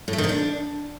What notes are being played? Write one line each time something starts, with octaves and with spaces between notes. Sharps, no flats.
A2
A3
D#3
C3
D4